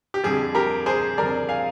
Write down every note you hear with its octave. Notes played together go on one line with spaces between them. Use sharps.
G4
F2 D3 G3 G#4
G4 A#4
G#4 C5
F2 D3 G3 A#4 D5
F5 G#5